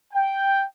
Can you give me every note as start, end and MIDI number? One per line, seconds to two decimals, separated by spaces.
0.13 0.64 79